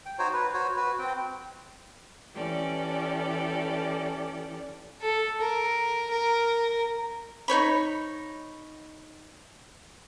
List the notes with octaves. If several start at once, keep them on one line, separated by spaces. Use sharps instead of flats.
G5
D#4 F#4 C5 C#5
B4
F#4 C5 C#5
F#4 B4
C4 G5
E3 C#4 G4 A4 D5
A4
A#4
A#4
D#4 C5 C#5 B5